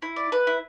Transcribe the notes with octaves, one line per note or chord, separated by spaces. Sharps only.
E4
D5
B4
E4